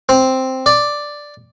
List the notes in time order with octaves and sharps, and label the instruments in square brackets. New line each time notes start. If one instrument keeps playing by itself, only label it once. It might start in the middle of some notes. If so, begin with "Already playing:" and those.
[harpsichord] C4
D5